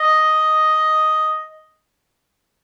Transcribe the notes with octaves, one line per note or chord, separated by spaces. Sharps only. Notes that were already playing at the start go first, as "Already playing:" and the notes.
Already playing: D#5